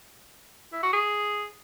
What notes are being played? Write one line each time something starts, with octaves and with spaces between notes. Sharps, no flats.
E4
F#4
G#4